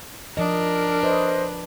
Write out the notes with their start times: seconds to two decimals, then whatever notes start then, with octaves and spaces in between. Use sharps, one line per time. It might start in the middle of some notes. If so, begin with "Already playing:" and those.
0.37 F3 D4 A#4 D#5
1.03 B4 C5 D#5